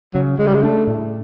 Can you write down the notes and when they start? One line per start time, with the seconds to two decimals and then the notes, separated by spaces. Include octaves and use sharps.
0.14 C#3 F#3
0.39 C#3 G#3
0.47 G3
0.54 G#3
0.63 A3 D4
0.87 A2